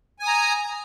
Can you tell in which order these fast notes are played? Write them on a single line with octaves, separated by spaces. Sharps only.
G#5 D#6 A#5